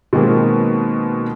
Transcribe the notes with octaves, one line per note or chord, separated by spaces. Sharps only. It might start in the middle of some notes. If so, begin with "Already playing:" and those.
B2 D#3 G#3 A#3 C4